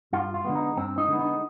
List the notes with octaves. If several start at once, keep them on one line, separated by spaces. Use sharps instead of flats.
G2 F4
F4
D3 G#3 B3
D#4
G2 C4
D#4
D3 G#3 B3
D#4